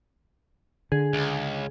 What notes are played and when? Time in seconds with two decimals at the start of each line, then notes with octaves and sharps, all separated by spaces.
0.92 D3 G#4
1.13 C#2